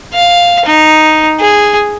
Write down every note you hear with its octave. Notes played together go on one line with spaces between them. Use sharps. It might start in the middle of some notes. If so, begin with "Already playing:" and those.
F5
D#4
G#4